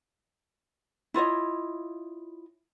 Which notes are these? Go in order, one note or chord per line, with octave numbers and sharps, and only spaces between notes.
E4 F4 C#5 D#5